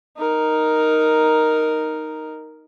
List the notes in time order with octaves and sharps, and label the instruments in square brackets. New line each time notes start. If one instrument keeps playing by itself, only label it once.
[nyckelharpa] D#4 A#4